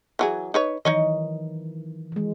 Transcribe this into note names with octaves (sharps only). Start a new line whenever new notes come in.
E3 F#3 G#4
D#4 B4 C#5
D#3 E3 F#3 D#4 C#5 D#5
E3 G#3